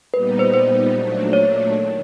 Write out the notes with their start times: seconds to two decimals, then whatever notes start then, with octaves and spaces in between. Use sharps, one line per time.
0.14 A#2 G3 B3 D#4 B4
0.39 C5
0.54 C5
0.92 A#2 F#3 A3 D4
1.33 C#5
1.73 D#3